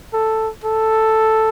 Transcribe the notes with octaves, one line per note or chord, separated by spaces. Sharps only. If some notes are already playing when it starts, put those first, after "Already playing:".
A4
A4